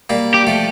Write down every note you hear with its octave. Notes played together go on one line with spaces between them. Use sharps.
G3 A#3
G4
F3 A3